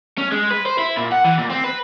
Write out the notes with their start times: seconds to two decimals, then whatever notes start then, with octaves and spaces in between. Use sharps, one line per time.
0.18 C#4
0.32 G#3
0.51 B4
0.66 C5
0.78 E4
0.97 A#2
1.12 F#5
1.24 E3
1.38 A#2
1.50 C4
1.64 B4